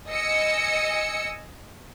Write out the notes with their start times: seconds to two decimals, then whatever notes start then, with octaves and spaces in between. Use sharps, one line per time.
0.10 D#5 G#5 E6 C#7